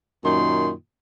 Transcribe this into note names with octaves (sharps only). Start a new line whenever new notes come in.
F#2 A#2 D#3 C6